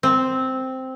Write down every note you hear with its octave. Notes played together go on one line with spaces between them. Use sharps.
C4